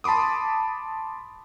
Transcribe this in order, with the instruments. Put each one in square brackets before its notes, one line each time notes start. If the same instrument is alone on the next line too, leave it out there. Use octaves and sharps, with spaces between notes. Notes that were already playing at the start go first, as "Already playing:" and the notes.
[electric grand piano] A5 B5 C6 D6 D#6